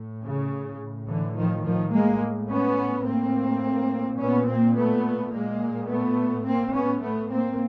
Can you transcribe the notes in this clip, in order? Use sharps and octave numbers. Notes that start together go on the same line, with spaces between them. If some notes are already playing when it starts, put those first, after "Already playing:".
Already playing: A2
C#3
A2
D3 E3
D#3 F3
D#3 F3
A2 G#3 A#3
B3 C#4
A2 A#3 C4
A#2 B3 C#4
A#3 C4
A3 B3
A#2 G#3 A#3
A3 B3
A2 A#3 C4
B3 C#4
A3 B3
A#3 C4